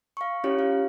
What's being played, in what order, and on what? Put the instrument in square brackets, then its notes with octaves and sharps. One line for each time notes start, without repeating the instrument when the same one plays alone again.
[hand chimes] F5 C#6
C#4 E4 F4 G4 C#5
F5